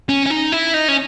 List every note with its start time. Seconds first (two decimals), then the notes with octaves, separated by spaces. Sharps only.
0.09 C#4
0.26 C#4
0.30 D#4
0.52 E4
0.74 D#4
0.88 C#4